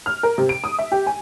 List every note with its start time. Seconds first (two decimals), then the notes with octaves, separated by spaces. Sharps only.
0.06 F6
0.23 A#4
0.38 C3
0.49 D7
0.64 D#6
0.78 E5
0.92 G4
1.06 G#5